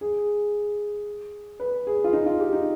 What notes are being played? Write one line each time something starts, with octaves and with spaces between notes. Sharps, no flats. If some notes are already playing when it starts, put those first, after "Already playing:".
G#4
B4
G#4
F4
D#4
F4
G4
D#4